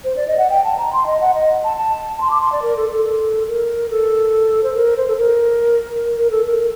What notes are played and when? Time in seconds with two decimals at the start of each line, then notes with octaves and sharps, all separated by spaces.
0.04 C5
0.16 D5
0.28 D#5
0.38 F#5
0.50 G5
0.64 A5
0.78 A#5
0.93 C6
1.06 D#5
1.20 F#5
1.34 D#5
1.64 A5
1.77 A5
2.21 C6
2.31 D6
2.41 C6
2.52 D5
2.62 A#4
2.77 A4
2.90 A4
3.48 A#4
3.90 A4
4.64 C5
4.75 A#4
4.97 C5
5.08 A4
5.17 A#4
6.17 A#4
6.31 A4
6.45 A#4